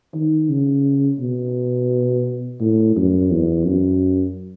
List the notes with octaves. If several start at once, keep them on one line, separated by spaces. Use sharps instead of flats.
D#3
C#3
B2
A2
F#2
E2
F#2